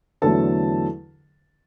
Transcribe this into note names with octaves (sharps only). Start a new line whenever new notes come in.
E2 D3 F#3 A3 A4 A5